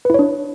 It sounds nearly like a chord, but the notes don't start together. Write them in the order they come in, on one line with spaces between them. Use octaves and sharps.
B4 E4 C#5 D4